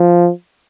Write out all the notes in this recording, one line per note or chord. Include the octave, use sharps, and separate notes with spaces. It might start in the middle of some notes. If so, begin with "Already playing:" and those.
Already playing: F3